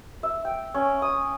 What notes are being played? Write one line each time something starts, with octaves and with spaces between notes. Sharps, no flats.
E5
G5
C#4
D#6